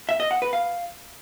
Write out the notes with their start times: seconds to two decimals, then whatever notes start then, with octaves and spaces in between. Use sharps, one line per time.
0.09 E5
0.20 D#5
0.31 F#5
0.42 B4
0.53 F5